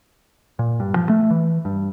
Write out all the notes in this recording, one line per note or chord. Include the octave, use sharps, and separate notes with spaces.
A#2
G2
F3
A3
E3
G2